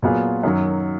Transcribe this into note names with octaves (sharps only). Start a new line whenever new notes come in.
A#2 F#3 B3 F4 G#4
F#2 D#3 F#3